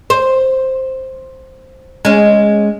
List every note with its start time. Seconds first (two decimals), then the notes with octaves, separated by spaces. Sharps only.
0.10 C5
2.05 G#3 C#4